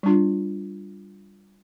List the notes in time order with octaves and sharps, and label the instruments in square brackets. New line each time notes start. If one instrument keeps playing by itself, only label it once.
[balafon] G3 D4 F4